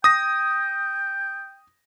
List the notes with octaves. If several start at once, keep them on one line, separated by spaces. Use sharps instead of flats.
G5 D#6 A#6